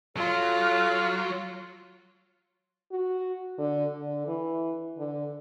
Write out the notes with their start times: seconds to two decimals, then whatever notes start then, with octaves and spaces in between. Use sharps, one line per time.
0.17 F#3 F4 A4 F6
2.92 F#4
3.58 D3
3.90 D3
4.27 E3
4.98 D3